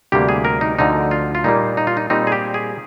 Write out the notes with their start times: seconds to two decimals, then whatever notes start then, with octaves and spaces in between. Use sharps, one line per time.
0.12 D2 C3 G3 A#3 G4
0.29 G#4
0.45 A#4
0.61 D#4
0.78 D2 D3 F3 D#4
1.11 F4
1.35 F4
1.44 A#2 G3 A#3 D#4
1.77 D#4
1.87 F4
1.97 D#4
2.10 A#2 G3 C4 D#4
2.27 G#4
2.32 G4
2.54 G#4